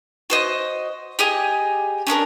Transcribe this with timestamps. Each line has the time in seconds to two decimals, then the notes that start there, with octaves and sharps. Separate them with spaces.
0.30 F#4 C5 D#5
1.19 G4 G#4 D#5
2.07 C#4 D4 G#4 A#4